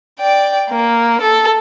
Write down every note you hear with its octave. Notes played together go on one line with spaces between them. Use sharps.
D5 G5
A#3
A4